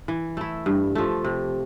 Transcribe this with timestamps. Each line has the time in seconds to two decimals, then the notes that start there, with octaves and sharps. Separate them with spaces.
0.08 E3
0.37 A3 E4
0.66 G2
0.95 F3 A3
1.24 C3